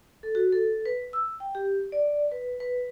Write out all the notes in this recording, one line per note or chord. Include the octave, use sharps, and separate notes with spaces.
A4
F#4
A4
B4
E6
G5
G4
D5
B4
B4